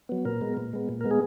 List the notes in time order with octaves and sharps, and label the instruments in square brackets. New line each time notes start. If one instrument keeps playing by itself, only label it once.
[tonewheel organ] F#3 B3
A#2 A#4
G#3 B3
A#2
G#3 B3
A#2
G#3 B3 A#4
G#4